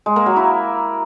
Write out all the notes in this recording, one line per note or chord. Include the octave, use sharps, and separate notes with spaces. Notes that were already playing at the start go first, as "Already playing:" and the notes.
G#3
A#3
F#3
E4